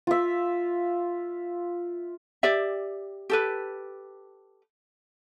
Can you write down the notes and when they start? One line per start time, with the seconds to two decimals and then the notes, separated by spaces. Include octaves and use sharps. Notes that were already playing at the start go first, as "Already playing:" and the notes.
0.07 F4 E5
2.43 G4 D5 E5
3.30 G4 A4 B4